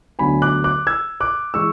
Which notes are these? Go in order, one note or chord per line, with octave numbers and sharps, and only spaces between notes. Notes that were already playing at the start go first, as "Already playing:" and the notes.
D2 D3 F#3 B3 G#5 B5
D6 F#6
D6 F#6
E6 G#6
D6 F#6
E3 G#3 C#6 E6